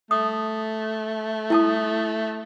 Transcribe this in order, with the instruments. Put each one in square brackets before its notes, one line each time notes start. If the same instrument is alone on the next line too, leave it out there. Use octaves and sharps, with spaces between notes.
[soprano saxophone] A3 [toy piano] D#6
[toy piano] E4 A5 D#6